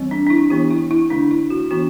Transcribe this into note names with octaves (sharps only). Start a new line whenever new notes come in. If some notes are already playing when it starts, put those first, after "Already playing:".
Already playing: E3 G3 C4
D4
D4
E4
E3 B3 D4 G4
E4
E4
D3 A3 D4
E4
F#4
E3 B3 D4 F#4